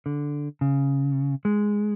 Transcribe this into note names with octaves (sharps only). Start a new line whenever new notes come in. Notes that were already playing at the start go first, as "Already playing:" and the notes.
D3
C#3
G#3